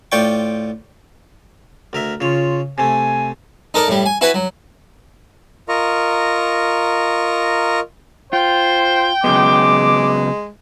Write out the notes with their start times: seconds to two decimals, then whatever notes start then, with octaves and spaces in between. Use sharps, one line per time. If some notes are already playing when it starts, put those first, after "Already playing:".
0.12 A2 F4 C5 D5 G5 C#6
1.93 D2 A#4 E5
2.21 C#3 F4 C#5
2.78 C3 A3 G#5
3.74 D#4 A4 A#4 D5
3.88 A2 G3
4.06 G#5
4.21 E4 F#4 B4 G#5 B5
4.34 F#3
5.69 F4 A#4 D#5 A#5 C#6
8.33 F4 C5 G5
9.24 C#3 F#3 G#3 B3 D6